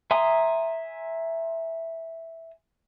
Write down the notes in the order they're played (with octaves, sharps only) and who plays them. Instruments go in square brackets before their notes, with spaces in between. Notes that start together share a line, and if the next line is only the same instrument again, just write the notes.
[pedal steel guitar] E5 G#5 A#5 C6 D#6